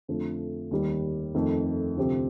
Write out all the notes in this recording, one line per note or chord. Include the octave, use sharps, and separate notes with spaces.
F2 D3 F3 A3
D#2 D#3 G3
F2 D#3 A3
D2 C3 F3 C4 G4